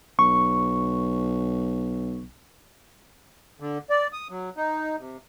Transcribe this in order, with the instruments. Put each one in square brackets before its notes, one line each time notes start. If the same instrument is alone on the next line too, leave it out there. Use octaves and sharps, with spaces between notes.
[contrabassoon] B1 [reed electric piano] C#6
[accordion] D3
D5
D#6
F#3
D#4
C3